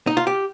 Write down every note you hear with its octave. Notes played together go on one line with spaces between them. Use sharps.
D#4
F4
G4